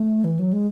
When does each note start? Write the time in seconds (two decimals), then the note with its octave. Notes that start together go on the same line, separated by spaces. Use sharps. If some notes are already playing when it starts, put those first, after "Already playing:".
Already playing: A3
0.24 E3
0.39 F#3
0.53 G#3